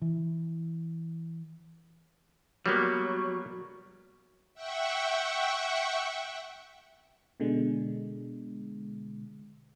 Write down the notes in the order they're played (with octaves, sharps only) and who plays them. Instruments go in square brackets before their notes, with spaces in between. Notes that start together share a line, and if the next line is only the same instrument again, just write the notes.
[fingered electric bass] E3
[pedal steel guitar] F#3 [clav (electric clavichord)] G3 A#3 B3
[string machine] E5 F#5 G5 C#6
[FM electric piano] B2 D3 G#3